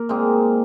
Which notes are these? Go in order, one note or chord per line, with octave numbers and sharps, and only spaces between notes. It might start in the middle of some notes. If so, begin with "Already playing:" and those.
Already playing: A#3 A#4
A#2 G#3 C4 D#4